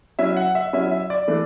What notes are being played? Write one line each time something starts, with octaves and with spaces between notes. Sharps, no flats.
F#3 C#4 E4 E5
F#5
E5
F#3 C#4 E4 E5
E5
D5
E3 A3 D4